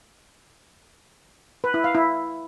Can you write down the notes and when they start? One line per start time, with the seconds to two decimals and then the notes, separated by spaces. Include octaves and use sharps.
1.64 B4
1.74 E4
1.84 F5
1.95 E4